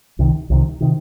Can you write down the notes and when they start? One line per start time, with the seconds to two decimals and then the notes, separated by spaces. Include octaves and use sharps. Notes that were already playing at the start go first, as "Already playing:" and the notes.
0.19 C2 C3 D#3
0.50 C2 C3 D#3
0.81 C3 D#3